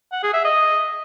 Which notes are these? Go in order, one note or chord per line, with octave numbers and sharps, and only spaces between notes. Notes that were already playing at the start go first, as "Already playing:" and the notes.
F#5
G#4
E5
D#5